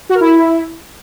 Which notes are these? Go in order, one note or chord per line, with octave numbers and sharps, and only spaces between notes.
F#4
A#4
E4